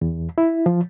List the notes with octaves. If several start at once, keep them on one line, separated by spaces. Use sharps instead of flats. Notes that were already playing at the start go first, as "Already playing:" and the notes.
E2
E4
F3